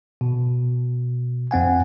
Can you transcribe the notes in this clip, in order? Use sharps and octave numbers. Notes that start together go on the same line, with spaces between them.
B2
F2 C4 F#5 G#5